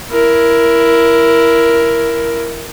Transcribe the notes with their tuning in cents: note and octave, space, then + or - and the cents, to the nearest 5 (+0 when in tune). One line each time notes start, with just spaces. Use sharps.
E4 +15 A#4 +10